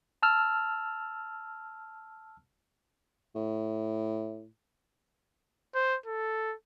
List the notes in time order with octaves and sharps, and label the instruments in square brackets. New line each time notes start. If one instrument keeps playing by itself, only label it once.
[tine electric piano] A5 E6 F6
[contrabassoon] A2
[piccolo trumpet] C5
A4